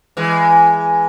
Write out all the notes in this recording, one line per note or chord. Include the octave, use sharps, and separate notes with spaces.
E3 G#3